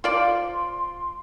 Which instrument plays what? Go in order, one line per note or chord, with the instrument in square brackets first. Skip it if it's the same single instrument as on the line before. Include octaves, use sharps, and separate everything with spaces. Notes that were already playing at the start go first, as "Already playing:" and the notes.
[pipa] F4 C5 D5 [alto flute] C6